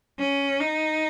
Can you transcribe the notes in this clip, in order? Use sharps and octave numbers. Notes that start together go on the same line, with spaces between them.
C#4
D#4